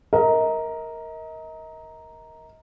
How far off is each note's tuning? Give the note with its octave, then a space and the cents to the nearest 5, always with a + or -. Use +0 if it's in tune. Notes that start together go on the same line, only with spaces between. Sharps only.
A#4 +0 D#5 +35